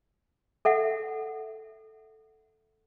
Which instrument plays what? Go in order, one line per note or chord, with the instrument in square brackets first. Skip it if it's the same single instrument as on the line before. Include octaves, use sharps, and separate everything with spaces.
[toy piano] A4 E5 F#5